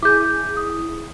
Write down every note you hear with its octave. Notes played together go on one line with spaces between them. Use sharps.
E4 G#4 D6 G6
D#6